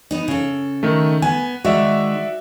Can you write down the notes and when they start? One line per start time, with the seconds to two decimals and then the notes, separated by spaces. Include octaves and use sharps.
0.11 B3 D#4
0.28 C#3 A4
0.83 D#3 A3
1.22 B3 G#5
1.65 D#3 G#3 F#4 D5 E5